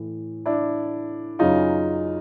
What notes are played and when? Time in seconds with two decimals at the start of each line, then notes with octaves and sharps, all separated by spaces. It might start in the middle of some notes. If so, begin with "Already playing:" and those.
Already playing: A2 E3
0.46 D4 E4
1.39 F#2 C#3 F#3 D#4 F4